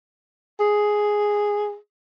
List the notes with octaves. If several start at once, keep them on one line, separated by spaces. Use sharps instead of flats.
G#4